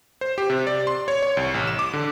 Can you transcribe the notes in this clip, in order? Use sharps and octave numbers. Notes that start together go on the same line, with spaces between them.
C5
G4
C3
D5
C6
C#5
C#5
C2
A1
E7
D6
D3